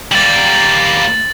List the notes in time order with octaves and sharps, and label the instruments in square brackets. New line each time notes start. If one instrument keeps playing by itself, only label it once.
[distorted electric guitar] G3 A#3 [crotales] A6 F#7